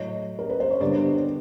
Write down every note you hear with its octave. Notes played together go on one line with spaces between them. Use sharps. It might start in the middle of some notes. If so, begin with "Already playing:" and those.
Already playing: A2 F#3 A3 C#5 D#5
A#4
B4
C5
C#5
G2 D3 G3 B3 C5 D5